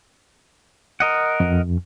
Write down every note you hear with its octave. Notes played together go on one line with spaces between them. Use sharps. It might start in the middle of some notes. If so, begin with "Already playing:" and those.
A#4 D#5 F#5
F2